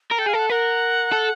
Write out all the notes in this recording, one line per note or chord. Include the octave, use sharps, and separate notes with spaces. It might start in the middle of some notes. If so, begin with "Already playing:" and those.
A#4
A4 G5
G#4 F5
A4
F#5
A#4 F#5
A4